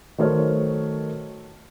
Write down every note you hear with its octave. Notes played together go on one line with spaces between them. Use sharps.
D#3 F#3 A3 C5 C#5 F6